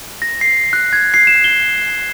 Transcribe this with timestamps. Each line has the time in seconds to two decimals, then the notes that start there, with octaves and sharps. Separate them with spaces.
0.22 A#6
0.41 C7
0.73 F#6
0.93 G#6
1.14 C7
1.27 E7
1.44 G7